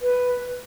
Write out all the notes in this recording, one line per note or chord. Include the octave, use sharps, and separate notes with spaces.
B4